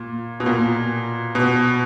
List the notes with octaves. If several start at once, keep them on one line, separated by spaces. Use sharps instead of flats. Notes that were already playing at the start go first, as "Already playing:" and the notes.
Already playing: A#2
B2
A#2
B2